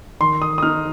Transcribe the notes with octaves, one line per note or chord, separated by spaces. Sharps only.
D#3 C6
D#6
D#6
D#4 F6